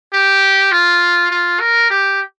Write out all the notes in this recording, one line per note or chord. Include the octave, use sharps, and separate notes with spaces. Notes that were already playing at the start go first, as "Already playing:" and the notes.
G4
F4
F4
A#4
G4